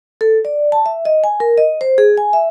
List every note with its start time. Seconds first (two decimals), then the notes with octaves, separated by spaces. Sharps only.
0.21 A4
0.45 D5
0.72 A5
0.86 E5
1.05 D#5
1.24 G#5
1.40 A#4
1.58 D#5
1.81 C5
1.98 G#4
2.17 G#5
2.33 E5